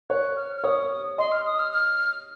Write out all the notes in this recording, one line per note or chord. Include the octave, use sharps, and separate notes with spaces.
C#5 F#6
F6
F6
C#5 D#6
D#5 C6
F6
D#6
F6
F6